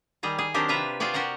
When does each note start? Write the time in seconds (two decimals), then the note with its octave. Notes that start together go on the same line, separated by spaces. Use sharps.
0.23 D#3 G3 G#4 A#5
0.38 G#4
0.54 D#3 F#3 C4 D4 G4 A#4
0.68 C3 F4 B4 E5 A#5
1.00 F4 F#4 G#4 D5 G5
1.14 F#4 G4 A#4 F#5 A#5